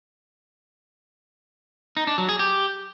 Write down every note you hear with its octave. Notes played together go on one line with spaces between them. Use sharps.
D#4
D4
F#3
G#4
G4